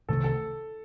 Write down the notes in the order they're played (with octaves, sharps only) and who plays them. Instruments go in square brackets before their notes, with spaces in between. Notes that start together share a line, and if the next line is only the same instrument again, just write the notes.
[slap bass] C2 C3 D#3 A3 [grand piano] A4
[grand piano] A4